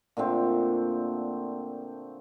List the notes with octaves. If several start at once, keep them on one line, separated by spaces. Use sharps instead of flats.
A#2 D3 A3 C4